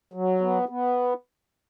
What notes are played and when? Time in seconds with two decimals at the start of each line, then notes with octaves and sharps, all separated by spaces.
0.13 F#3
0.41 B3
0.69 B3